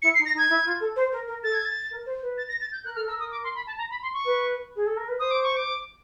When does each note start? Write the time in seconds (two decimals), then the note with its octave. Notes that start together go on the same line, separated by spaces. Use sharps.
0.02 E4 C#7
0.14 C7
0.18 D#4
0.25 A#6
0.33 D#4
0.38 G#6
0.49 E4
0.65 F4
0.80 A4
0.96 C5
1.12 A#4
1.28 A#4
1.43 A4 A6
1.54 G#6
1.65 A6
1.91 A#4
2.06 C5
2.21 B4
2.38 A6
2.49 A#6
2.61 A6
2.72 G6
2.85 A#4 F#6
2.96 A4 F6
3.08 A#4 E6
3.20 D#6
3.31 D6
3.44 C6
3.55 B5
3.67 A5
3.78 A#5
3.90 B5
4.02 C6
4.13 C#6
4.25 B4
4.76 G#4
4.86 A4
4.97 A#4
5.08 B4
5.19 C5 D#6
5.31 D6
5.43 C#6
5.56 D6